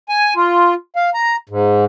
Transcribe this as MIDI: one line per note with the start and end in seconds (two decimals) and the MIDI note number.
0.09 0.34 80
0.36 0.74 65
0.96 1.10 77
1.14 1.36 82
1.49 1.85 44